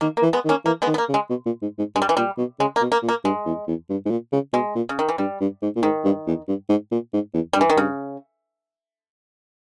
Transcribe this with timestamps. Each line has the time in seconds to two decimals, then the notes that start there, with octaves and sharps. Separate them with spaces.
0.01 D#3 A#3
0.17 A#3
0.22 E3
0.33 G#3 B3
0.45 D#3
0.49 A#3 C#4
0.65 E3 A#3
0.82 G#3 B3
0.87 D#3
0.94 B3
0.98 A#3
1.09 C#3
1.14 G#3
1.30 B2
1.46 A#2
1.62 G#2
1.79 G#2
1.96 G2 G#3
2.02 G3
2.09 E3
2.17 A#2 G3
2.38 B2
2.59 C#3 G#3
2.76 A#3
2.81 B2
2.92 A#3
3.03 A#2
3.08 A#3
3.24 G2 G#3
3.46 E2
3.68 E2
3.90 G2
4.06 G#2
4.10 A#2
4.32 C#3
4.53 B2 G#3
4.75 A#2
4.89 C#3
4.99 D#3
5.09 E3
5.18 G2 G3
5.41 G2
5.62 G#2
5.76 A#2
5.83 G#2 D#3
6.05 G2
6.27 E2
6.48 G2
6.69 G#2
6.91 A#2
7.13 G#2
7.34 E2
7.53 G2 G3
7.61 E3
7.70 D#3
7.77 G2 C#3